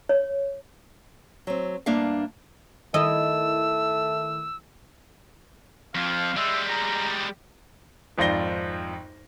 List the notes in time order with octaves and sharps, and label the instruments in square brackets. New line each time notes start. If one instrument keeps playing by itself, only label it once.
[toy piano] C#5
[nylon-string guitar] F#3 C4
G2 A#3 D4 E5 F5
[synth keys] D#3 E4 [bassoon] A3 [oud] D#5 [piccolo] E6
[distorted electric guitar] F2 F3 [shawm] F5
[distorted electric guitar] G3 G#3 [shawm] E5
[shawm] A#5
[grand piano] G#1 F2 F4 D5 A#6 G7